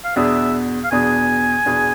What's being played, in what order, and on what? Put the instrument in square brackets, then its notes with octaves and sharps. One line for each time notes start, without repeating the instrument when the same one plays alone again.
[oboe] F5
[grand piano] E2 B2 B3 D4 G#4 [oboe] E5
[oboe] F5
[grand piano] E2 B2 B3 D4 G#4 [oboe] G#5
[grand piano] E2 B2 B3 D4 G#4